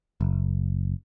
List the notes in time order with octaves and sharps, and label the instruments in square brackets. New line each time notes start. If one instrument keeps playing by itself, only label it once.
[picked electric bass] F#1